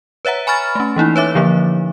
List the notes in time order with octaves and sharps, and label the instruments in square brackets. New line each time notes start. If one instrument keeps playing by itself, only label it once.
[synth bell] B4 C#5 E5 F#5 A#5
G#5 B5 C#6 F6 A6
A3 C#4
E3 A#3 D#4 E4
B4 C#5 E5 D6
D3 F3 A#3